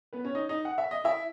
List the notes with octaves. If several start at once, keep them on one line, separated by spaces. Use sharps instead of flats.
B3 B4
C#4 C#5
D#4 D#5
D#4 D#5
F#5
E5
D#5
E4 E5